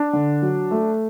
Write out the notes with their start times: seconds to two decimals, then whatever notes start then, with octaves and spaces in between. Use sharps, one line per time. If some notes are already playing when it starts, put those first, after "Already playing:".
Already playing: D4
0.13 D3
0.42 F#3
0.71 A3